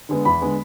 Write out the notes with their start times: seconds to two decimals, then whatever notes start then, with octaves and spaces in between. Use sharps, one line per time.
0.09 D3 G#3 B3
0.25 E2 B5
0.42 D3 G#3 B3